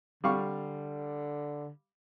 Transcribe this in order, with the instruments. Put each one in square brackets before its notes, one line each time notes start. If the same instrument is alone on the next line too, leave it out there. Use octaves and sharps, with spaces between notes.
[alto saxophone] D3 [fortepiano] G3 F5 C#6